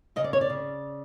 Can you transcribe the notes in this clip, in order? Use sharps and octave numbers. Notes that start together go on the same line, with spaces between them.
C#3 D#5
D5
C#5
D5
C#3